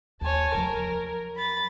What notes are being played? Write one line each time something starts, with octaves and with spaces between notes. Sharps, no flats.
D#2 C#5 G#5 A5
F3 F#3 A#4
B5 A6